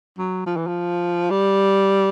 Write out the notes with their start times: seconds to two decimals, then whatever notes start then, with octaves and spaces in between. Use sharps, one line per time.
0.18 F#3
0.46 F3
0.57 E3
0.67 F3
1.30 G3